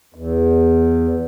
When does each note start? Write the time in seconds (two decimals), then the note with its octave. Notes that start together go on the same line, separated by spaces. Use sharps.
0.15 E2